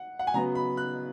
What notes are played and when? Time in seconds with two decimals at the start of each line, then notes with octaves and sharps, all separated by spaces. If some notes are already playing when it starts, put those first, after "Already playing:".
Already playing: F#5
0.19 F#5
0.27 G#5
0.34 C#3 F#3 B3 A#5
0.55 B5
0.77 F#6